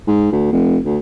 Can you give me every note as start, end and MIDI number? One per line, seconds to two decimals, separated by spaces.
0.07 0.28 44
0.32 0.51 38
0.52 0.77 29
0.85 0.97 38